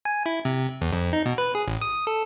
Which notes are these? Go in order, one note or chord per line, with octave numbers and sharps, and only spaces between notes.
G#5
E4
C3
E2
F2
D#4
B2
B4
G#4
A1
D#6
A4